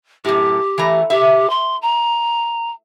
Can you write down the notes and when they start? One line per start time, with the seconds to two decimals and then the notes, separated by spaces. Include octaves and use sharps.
0.25 F#2 A2 G4
0.78 E3 A3 A#5
1.10 G4 E5
1.50 C6
1.82 A#5